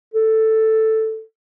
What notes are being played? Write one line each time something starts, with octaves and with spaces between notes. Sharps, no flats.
A4